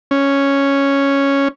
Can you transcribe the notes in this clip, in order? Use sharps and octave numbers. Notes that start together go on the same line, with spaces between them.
C#4